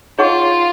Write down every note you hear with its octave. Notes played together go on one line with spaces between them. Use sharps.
D#4 F4 G#4 C#5 F#5 C#6